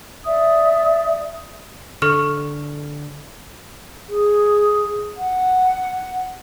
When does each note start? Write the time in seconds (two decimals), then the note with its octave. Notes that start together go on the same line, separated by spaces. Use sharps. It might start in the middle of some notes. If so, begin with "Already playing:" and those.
0.25 D5 E5 D#6
2.02 D3 A4 C#6 F6
4.09 G#4
5.17 F#5